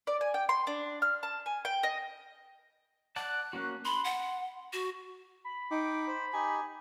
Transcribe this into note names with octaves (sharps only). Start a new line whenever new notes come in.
D5
G#5
G5
C6
D4
F6
A5
G#5
G5
D#5
D5 F#5 A5 F#6
A#3 C#4 F#4
B5 C6
F#5
F#4
B5
D#4 G5 D6
C5
D#4 G4 G#5